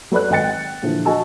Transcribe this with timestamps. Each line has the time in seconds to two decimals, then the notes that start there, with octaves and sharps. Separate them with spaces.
0.12 F#3 A4 B4 D5 F#6
0.30 G#1 D#5 F#5 G5 A6 C#7
0.48 G5
0.82 A#2 D3 E3 F3
1.05 F#4 D#5 G#5 A5 E6